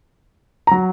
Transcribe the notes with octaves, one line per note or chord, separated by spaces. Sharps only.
A#5
F#3